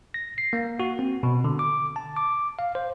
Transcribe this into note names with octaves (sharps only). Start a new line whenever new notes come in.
A#6
C7
A#3
F#4
C4
B2
D3
D6
A5
D6
F5
C5